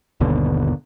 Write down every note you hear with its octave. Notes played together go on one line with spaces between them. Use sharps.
G1 D#2 B2 D3